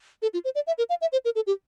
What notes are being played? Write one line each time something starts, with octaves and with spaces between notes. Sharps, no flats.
A4
F4
C5
D5
E5
A#4
F5
E5
C5
A#4
A4
G4